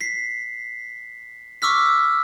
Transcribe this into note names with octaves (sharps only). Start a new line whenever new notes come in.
B6 C7
C#6 D6 E6 F6 B6